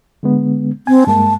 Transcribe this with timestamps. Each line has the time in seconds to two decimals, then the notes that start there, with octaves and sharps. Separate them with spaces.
0.23 D3 G#3 B3
0.87 C4 G#5
1.07 G2 G#3 A#3 A5